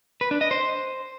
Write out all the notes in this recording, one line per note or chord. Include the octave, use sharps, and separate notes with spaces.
B4
D4
D#5
C5